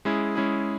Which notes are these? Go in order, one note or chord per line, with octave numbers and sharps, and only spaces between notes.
G#3 C#4 E4 G#4
G#3 C#4 E4 G#4